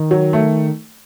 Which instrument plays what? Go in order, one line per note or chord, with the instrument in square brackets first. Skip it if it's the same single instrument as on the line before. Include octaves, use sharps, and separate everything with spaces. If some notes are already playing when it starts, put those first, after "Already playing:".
Already playing: [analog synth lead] D#3
[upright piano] F#3
A3